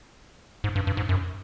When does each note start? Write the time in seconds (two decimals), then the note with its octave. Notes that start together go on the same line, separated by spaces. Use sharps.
0.64 G#2
0.76 G2
0.87 G2
0.97 G#2
1.09 F#2